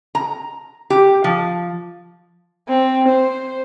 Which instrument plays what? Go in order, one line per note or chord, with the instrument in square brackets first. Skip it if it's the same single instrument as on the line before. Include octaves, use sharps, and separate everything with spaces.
[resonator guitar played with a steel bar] A#5
G4
F3
[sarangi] C4
C5